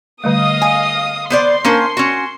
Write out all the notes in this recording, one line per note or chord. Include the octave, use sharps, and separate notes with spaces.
D3 G3 A3 D#5 F5 D#6
G#5
B3 C5 D5 C6
A#3 C#4 D4 A#4 C5 A5
C#4 F#4